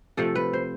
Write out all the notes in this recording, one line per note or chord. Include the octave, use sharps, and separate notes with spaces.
C3 F3 A3 A4
B4
C5